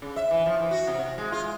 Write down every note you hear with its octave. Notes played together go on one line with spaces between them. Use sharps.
C#3
E5
E3
F3
E3
F#4
C3
C3
G#3
F4
G#3